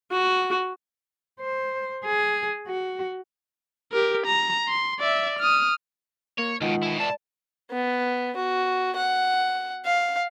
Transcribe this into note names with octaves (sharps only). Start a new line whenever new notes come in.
F#4
C5
G#4
F#4
G4 A#4
A#5
C6
D5 E5
D#6 F6
A#3 C#5
C#2 B2 D#3 G#3 F4 F#5
B2 E4
D5 A5
B3
F#4
F#5
F5